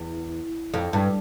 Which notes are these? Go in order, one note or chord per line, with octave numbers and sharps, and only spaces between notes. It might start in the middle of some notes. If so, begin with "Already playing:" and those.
Already playing: E2
F2
G2